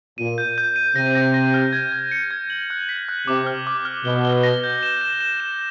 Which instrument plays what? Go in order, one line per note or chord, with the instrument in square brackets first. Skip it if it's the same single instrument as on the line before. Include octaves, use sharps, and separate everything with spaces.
[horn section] A#2 [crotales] D#7
[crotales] G6
G6
D#7
[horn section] C3 [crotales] A#6
[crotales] A#6
A#6
F6
G#6
G#6
C#7
G#6
F#7
F#6
B6
F#6
[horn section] C3 [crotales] D6
[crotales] F6
D6
F6
[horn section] B2 [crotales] G7
[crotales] G7
A#6
G6
E7
E7
E7
E7